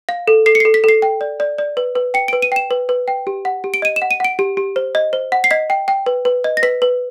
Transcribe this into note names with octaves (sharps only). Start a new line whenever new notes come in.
F5
A4
A4 C7
C#7
C7
A4
B6
A4 C7
G5
D5
D5
D5
B4
B4
G5 C#7
D7
B4
D#7
G5 E7
B4
B4
G5
G4
F#5
G4
D7
D#5 D#7
E7
F#5
D#7
F#5 D7
G4
G4
C5
D#5
C5
F#5
C7
D#5 B6
G5
G5
B4
B4
D#5
A#6
B4 B6
B4